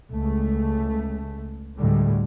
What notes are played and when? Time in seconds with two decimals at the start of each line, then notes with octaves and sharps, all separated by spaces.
0.10 C#2 A3
1.77 D2 A2 D3 G3 G#3